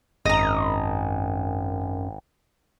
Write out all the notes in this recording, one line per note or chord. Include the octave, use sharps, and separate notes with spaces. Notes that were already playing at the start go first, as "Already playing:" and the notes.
G#1 F#2 D#5 A#5